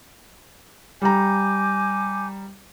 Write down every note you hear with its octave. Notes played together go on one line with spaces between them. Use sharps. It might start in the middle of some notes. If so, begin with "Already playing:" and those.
G3 G#5 A#5 D6 G6